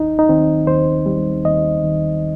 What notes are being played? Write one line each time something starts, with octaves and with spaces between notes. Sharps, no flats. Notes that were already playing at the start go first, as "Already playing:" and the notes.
Already playing: D#2 D#4
D#4
D#3 C4
D#2 C5
G3
D#2 D#5
D#3